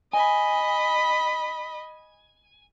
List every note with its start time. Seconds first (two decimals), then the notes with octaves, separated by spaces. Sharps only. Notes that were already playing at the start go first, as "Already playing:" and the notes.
0.13 D#5 G#5 B5